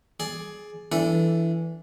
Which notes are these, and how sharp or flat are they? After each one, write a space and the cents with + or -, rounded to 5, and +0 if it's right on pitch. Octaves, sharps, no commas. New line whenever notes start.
G#4 +15 D5 +0
E3 +5 D4 -20 A4 +0